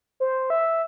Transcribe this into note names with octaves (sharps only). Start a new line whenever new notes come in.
C5
E5